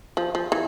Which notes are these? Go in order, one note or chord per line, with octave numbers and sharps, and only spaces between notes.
F3
F3
E3